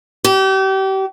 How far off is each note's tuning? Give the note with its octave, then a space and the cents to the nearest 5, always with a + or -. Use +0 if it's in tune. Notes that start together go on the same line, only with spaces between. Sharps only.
G4 -35